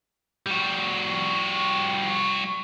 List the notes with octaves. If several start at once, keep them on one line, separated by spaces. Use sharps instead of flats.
G3 F#4